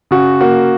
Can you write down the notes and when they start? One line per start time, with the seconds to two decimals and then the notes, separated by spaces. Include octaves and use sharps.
0.11 C#3 F#4
0.41 A#3 F#4